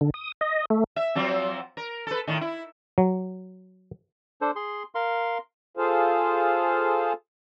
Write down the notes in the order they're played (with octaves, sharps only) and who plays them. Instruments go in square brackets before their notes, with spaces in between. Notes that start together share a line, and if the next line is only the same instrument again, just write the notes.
[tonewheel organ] D3
D#6
D#5
A3
[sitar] E5
F3 F#3 C4
A#4
A4 B4
A2 D#3
E4
[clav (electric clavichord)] F#3
[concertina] D4 A4 C5
G#4 C6
A#4 F5 C6
[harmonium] F4 G#4 A4 C5 F5